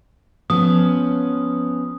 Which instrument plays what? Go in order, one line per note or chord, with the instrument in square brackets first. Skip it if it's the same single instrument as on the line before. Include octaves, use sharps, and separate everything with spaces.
[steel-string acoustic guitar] F3 B3 C#4 [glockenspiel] D#6